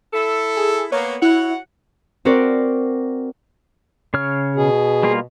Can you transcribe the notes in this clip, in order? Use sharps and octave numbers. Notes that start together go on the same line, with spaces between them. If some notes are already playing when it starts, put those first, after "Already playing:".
E4 A4
G#4
A#3 B3 C#5
E4 F#4 C#5 F#5
C4 F#4 A#4 C5 D5
C#3 C#5 F6
B2 G#4
G3 A#3 F4